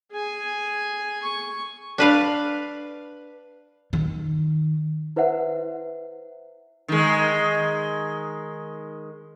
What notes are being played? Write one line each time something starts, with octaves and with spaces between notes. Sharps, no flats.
G#4 G#5
C#6
D4 B4 F5
D#3
E4 B4 C5 E5 F#5
D#3 G#3